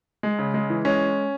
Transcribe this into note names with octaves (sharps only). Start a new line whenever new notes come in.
G#3
C#3
G#3
E3
G#3 C#4